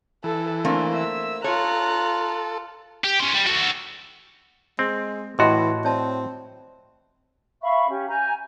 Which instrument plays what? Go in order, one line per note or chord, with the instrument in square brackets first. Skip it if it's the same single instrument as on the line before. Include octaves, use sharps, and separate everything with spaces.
[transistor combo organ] E3 [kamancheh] A4
[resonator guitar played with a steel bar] A3 A#3 C4 [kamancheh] D4 G#5
[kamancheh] E5 E6
[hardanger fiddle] F4 [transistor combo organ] A4 [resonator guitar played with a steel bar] C#5 [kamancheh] A#5 F#6
[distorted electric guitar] G4
C#4 C5
G3
F#4 A4
[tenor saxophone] G#3 [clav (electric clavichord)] C4
[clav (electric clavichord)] A2 F#4 [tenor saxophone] E3 [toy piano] G4 D#5 C6
[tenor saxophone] C4 [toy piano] C#5 D5 A5
[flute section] E5 F5 B5 C#6
C#4 G4
G#5 A#5 G6